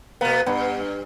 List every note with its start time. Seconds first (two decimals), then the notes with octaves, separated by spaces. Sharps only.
0.21 B2 A#3 B3
0.46 G2 B3 B4